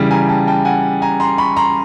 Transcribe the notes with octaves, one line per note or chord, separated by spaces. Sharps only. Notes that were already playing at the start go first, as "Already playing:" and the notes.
Already playing: C#3 E3 G3
G#5 A#5
G5 A5
G5 A5
F#5 G#5
G#5 A#5
A#5 C6
B5 C#6
A#5 C6